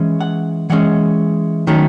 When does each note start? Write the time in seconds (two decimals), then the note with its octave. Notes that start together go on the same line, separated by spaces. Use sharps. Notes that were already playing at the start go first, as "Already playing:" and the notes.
Already playing: E3 G#3 C#4
0.21 F#5
0.70 E3 G#3 C#4 F#5
1.67 D#3 F#3 A3 C#4